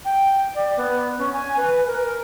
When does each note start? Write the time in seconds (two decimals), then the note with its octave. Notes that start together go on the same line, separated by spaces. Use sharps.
0.05 G5
0.55 D5
0.77 B3
1.18 C#4
1.33 G#5
1.57 B4
1.87 A#4